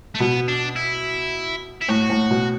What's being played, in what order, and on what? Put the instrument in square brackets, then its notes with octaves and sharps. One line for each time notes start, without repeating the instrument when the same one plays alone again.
[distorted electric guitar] A3
[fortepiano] B2 [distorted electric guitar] B3
[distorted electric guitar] D4
E4
E4
[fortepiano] A2 [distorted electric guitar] F#4
[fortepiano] A2
B2